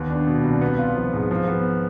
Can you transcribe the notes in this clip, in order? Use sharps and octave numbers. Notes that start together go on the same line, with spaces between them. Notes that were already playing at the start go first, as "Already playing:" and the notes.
Already playing: D#2 B3
D4
B2
C2
B3
F4
F3
G#2
F3
B3